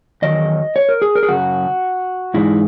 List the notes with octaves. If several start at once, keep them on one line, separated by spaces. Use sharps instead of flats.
E2 D#3 F#3 D#5
C#5
A#4
G#4
A#4
G#4
F#2 C#3 F#3 F#4
G#2 E3 G#3 D#4 E4